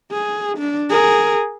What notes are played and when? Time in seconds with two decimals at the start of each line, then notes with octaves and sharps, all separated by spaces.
0.12 G#4
0.58 D4
0.90 G#4 A#4